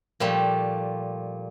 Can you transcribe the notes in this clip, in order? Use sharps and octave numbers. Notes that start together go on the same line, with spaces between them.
A#2 F3 G3 A3